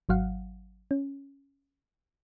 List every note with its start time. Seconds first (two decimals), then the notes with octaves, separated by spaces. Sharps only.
0.09 G#1 F#3 F5 F#5
0.91 C#4